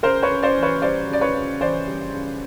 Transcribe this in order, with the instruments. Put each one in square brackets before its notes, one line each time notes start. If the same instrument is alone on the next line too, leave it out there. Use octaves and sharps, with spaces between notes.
[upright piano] C#3 A#4 C5
B4 C#5
C#3
C5 D5
E3
B4 C#5
G3 C5 D5
C#3 D5
B4 C#5
C#3
E3 C5 D5
G3
C#3